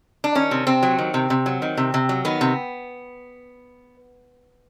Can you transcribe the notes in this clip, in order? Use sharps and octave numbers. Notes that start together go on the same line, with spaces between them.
D4
D#3 C#4
C3
C3 C4
F#3
D#3
C3
C3
F#3
D#3
C3
C3
F#3
D#3 B3
C3